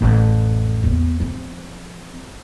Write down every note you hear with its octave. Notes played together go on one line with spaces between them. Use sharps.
A1 F2
E2 B3
F3 C4